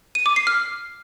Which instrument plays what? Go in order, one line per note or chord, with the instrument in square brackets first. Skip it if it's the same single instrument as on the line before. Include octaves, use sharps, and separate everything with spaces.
[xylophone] D#7
D6
C7
F6